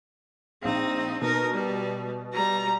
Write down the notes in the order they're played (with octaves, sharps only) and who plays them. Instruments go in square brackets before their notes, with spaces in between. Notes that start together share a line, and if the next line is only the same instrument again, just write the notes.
[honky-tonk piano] A#1 F5 [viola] C4 D#4
[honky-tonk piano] B2 [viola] D#4 A#4
[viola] G3
[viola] G3 [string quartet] A#5